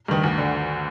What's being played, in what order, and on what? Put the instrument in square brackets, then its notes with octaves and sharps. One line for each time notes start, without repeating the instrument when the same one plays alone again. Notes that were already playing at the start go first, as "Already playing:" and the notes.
[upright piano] G2 D#3
D2
D3